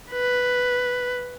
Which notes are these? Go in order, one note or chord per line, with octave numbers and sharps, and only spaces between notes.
B4